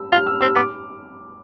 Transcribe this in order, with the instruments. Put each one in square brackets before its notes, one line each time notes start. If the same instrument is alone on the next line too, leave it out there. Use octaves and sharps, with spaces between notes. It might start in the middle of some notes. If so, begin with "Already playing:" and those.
Already playing: [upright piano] E6
[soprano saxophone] F4 [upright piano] F6
[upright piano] E6
[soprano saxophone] C4 [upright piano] E6
[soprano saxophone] B3 [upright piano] D6